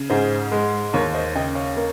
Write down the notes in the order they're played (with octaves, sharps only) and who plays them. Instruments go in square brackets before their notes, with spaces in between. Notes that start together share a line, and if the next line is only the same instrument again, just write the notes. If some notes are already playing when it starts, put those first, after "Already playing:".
Already playing: [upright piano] C#3
[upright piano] G#2 [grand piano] G#4 C5
[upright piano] G#3
[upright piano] D#2 [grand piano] A#4 C#5
[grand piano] C5 D#5
[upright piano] C#3 [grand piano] D#5 G5
[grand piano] C#5 F5
[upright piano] A#3